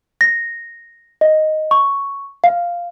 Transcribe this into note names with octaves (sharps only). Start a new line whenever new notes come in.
A#6
D#5
C#6
F5